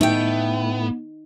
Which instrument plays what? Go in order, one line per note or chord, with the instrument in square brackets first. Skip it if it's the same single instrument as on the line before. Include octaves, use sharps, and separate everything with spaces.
[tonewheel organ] A2 [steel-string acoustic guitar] A3 G5 [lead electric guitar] B3 [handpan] D#4